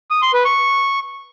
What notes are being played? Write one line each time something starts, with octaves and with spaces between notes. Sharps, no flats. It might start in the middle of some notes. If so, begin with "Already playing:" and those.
D#6
C6
B4
C#6